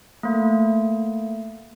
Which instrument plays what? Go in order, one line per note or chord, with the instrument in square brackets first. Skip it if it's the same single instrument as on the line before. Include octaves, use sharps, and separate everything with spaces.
[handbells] A3 A#3